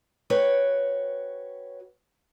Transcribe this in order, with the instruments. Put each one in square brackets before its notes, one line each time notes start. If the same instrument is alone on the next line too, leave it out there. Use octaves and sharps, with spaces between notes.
[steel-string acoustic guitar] F#4 B4 C#5 G5